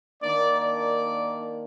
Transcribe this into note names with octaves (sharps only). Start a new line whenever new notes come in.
D#3 A#3 D4 D5
D5